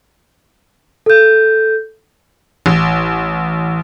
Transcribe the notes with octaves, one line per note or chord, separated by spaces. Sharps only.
A4 G6
A1